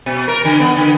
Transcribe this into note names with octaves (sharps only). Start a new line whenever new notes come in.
B2
A#4
D3
B3
D3